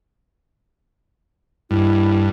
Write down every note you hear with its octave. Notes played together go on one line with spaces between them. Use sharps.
G2 E4